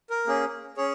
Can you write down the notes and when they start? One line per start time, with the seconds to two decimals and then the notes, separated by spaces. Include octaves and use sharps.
0.10 A#4
0.27 A#3 C#4 G#4
0.77 C#4 G#4 C#5